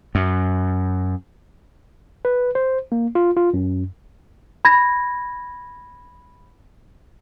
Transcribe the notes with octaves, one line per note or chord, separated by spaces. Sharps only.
F#2
B4
C5
A#3
F4
F4
F#2
B5 G#6 A#6